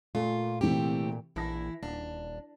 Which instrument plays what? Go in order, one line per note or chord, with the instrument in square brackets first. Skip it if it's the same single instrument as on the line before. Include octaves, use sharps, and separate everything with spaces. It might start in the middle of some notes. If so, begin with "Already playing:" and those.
[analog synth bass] A#2 [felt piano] A3 [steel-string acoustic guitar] F4
[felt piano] C3 E3 [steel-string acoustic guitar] A3 C4 G4
[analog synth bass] A#1 [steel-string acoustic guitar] E3 E4 [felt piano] A5 A#6
[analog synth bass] D#1 [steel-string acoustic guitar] D4